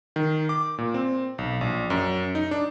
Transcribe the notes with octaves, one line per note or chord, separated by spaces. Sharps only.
D#3
D6
A#2
C4
B1
A#1
F#2
D#4
D4